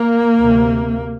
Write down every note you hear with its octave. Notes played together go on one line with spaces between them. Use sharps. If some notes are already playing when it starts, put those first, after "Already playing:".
Already playing: A#3
D2 C3